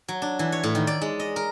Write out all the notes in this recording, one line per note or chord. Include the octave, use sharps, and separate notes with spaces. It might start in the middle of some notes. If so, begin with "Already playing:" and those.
F#3
D4
E3
C#5
A2
D#3
D5
G#3
D#5
A#4